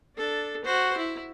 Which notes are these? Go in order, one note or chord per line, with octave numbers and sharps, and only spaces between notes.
D4 A4
F#4 C5
E4